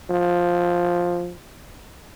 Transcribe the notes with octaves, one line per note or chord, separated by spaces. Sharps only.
F3